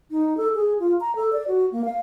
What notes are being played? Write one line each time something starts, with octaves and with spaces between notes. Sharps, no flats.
D#4
A4
G#4
F4
A#5
A4
D5
F#4
A#3
F5